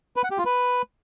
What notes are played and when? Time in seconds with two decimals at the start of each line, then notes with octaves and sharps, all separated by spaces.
0.16 B4
0.24 F#5
0.31 G4
0.38 F4
0.45 B4